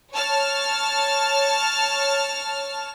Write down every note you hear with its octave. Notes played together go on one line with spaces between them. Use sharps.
C#5 A5 F6